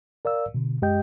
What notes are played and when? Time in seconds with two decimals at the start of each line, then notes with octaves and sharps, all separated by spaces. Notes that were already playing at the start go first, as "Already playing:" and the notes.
0.25 A#4 D5 F5 E6
0.54 B2 D3
0.82 F#2 G#3 G4 D#5 G5 G6